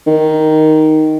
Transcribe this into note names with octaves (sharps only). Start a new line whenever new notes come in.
D#3